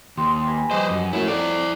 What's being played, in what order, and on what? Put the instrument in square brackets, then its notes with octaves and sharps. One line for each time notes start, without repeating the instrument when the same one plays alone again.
[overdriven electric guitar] D#2 [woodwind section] G4 C6
[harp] B4 G#5 A#5
[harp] F3 G3 [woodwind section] G4 D#5 [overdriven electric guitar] B4 C5
[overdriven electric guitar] F#2
[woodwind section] F#2 [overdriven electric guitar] A3 E4
[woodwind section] F2 [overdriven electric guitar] E4 D5